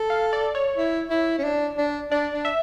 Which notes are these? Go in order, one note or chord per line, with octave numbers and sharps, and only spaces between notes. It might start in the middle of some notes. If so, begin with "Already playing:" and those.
Already playing: A4
F5
D5
C#5
E4
E4
C#4
D4
D4
D4 D5
D4
E5